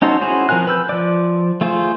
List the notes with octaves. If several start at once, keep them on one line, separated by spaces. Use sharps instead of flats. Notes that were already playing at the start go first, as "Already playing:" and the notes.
C#4 D#4 F#4 A4 C5
C#4 E4 F#4 G#4 C5
F3 C4 A#4 G#5 F#6
B4 E6 G6
F3 D5
A3 F4 G#4 C5